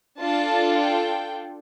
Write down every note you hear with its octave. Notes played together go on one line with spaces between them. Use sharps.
D4 F4 A4 A5
G5